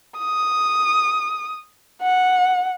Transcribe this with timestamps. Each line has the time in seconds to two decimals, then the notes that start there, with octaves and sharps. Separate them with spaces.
0.19 D#6
2.02 F#5